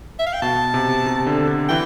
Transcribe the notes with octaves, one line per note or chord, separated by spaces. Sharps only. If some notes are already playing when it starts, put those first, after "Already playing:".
E5
F5
G5
B2 A5
C3
C3
D3
D3
E3 G5